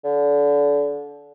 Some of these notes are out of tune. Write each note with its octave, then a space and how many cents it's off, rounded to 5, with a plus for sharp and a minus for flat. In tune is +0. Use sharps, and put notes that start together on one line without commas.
D3 -30